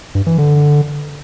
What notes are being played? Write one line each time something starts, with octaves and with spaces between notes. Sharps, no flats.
G2
E3
D3